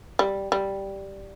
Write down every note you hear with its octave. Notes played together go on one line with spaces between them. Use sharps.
G3
G3